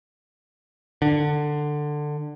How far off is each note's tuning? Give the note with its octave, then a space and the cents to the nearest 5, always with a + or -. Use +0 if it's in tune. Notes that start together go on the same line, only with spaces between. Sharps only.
D3 +15